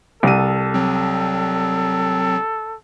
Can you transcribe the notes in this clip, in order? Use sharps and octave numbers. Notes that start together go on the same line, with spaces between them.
C2 A4 D#7
F#3 C4